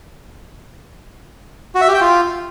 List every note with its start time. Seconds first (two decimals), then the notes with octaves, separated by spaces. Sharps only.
1.75 F#4
1.81 E5
1.88 G4
1.94 G5
2.01 F4